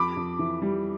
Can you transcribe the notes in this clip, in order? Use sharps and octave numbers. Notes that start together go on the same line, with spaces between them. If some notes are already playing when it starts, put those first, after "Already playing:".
Already playing: F2 B5 D6
F2
E3
G3